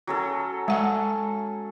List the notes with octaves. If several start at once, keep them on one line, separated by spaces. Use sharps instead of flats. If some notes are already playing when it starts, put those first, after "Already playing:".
F#3 C#4 A4
G#3 F#5